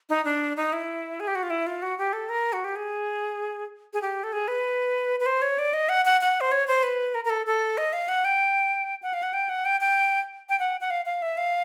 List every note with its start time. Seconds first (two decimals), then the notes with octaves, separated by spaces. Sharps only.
0.09 D#4
0.25 D4
0.57 D#4
0.73 E4
1.20 G#4
1.28 G4
1.35 F#4
1.43 F4
1.50 E4
1.67 F4
1.82 F#4
1.98 G4
2.13 A4
2.29 A#4
2.53 F#4
2.64 G4
2.76 G#4
3.93 G#4
4.02 G4
4.24 A4
4.33 G#4
4.48 B4
5.20 B4
5.26 C5
5.42 C#5
5.59 D5
5.73 D#5
5.89 F#5
6.05 F#5
6.21 F#5
6.41 C5
6.52 C#5
6.68 C5
6.83 B4
7.15 A#4
7.25 A#4
7.30 A4
7.46 A4
7.78 D#5
7.93 F5
8.08 F#5
8.25 G5
9.03 F#5
9.13 F5
9.23 F#5
9.33 G5
9.49 F#5
9.65 G5
9.81 G5
10.49 G5
10.59 F#5
10.80 F#5
10.90 F5
11.06 F5
11.22 E5
11.37 F5